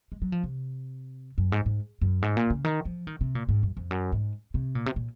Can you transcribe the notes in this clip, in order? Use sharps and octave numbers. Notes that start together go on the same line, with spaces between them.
G#3
F#3
F3
C3
F#2
G#2
G#2
F#2
G#2
A#2
C#3
D#3
F3
D#3
C3
A#2
G#2
F#2
F2
F#2
G#2
C3
A#2
C3
A#2